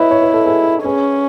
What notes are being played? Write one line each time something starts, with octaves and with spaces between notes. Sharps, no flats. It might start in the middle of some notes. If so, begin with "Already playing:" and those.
Already playing: E4 B4 C#5 D#5 E5
C#5
B4
A4
G#4 B4
C#4 G#4 B4